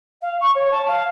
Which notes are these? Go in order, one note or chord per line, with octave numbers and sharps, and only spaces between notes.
F5
C#6
C#5
A5
F5